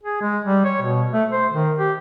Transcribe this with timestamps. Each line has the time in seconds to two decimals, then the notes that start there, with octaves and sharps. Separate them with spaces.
0.03 G#4
0.21 G#3
0.45 G3
0.65 C#5
0.82 B2
1.12 A3
1.32 C5
1.52 D#3
1.78 G4